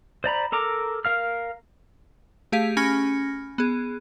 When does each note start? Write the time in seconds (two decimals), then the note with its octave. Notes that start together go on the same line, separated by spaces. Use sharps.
0.24 C5 D5 A#5 B5
0.52 A4 A#4 A#5 D6
1.05 A#4 F5 F6
2.52 A3 G4 G#4 F5 B6
2.77 C#4 G#5 B5 F6 A#6 C#7
3.58 B3 G#4